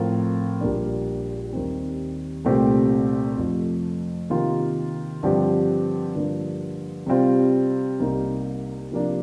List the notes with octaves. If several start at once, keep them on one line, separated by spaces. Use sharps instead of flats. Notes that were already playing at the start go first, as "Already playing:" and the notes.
Already playing: A2 F3 C4 F4 A#4
A#1 A#2 G3 A#3 D4
D#2 D#3 G3 C4
C2 A#2 A3 C4 G4
F2 C3 F3 A3
C3 D#3 A#3 F4
G2 D3 F3 C4 G4
G2 D3 F3 A#3 D4
C3 G3 C4 F4
C2 C3 G3 A#3 D#4
C3 F3 A#3 D4